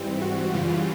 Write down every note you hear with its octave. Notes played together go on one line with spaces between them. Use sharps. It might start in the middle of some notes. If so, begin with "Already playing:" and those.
Already playing: G#2 E3 G3 C4
F#4
F#2 C#3 E3 G3 F4